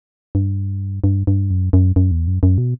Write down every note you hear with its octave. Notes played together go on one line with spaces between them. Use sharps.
G2
G2
G2
F#2
F#2
F#2
E2
F#2
F#2
B2